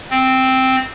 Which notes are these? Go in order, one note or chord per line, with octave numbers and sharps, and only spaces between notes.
C4